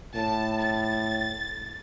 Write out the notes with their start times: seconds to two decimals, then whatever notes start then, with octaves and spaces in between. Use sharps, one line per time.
0.15 A2 A5
0.62 A6